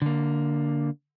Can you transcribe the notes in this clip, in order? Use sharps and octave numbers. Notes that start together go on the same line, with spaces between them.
D3 A#3